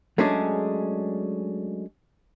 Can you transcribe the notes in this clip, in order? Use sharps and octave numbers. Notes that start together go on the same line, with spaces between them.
F#3 G#3 A3 C#4 D4 G#4